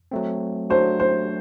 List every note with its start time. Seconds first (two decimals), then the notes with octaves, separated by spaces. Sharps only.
0.11 F#3 A3 C4
0.70 F#3 A3 D4 F#4 C5
1.00 C5